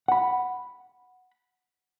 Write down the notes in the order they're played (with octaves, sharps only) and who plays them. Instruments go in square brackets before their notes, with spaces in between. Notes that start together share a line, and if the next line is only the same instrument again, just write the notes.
[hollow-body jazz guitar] F#5 B5